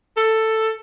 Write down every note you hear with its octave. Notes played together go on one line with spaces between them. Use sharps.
A4